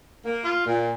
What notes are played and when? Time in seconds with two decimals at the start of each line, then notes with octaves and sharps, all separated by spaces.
0.24 A#3
0.44 F4
0.66 A#2